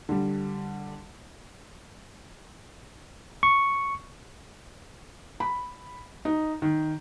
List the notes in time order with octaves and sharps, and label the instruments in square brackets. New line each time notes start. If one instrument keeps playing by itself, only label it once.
[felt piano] D3 G3
[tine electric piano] C#6
[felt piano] B5
D#4
D#3